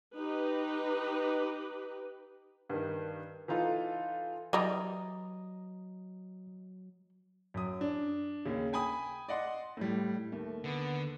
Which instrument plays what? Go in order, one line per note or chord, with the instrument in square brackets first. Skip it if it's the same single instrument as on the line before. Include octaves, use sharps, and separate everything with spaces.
[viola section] D#4 G4 B4
[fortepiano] G2 D#3
E3 D#4 F4 A4
[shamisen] E3 G3 [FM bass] F#3 [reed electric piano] D#5 A#5 D#6
[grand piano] F#2 D#6
D4
D#2 C#3
G5 G#5 B5 D#6
D5 D#5 F#5 C6
A2 G3
[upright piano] D#2 [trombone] A3
[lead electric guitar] D3 [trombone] B3